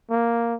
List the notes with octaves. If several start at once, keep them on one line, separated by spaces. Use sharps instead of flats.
A#3